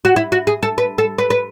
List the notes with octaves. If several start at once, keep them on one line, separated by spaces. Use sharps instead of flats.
F#4
E4
F#4
G#4
A4
B4
A4
B4
B4